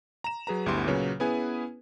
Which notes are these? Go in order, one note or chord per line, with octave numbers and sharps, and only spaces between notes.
A#5 E7
F#3 G#4 B4 A#5
G1 D2 B3 E4 G4 C6
A#2 C#3 F#3 B4 C#5
B3 C#4 E4 G#4 B4 G#5